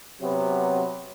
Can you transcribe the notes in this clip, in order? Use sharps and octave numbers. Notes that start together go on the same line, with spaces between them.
C3 F#3 B3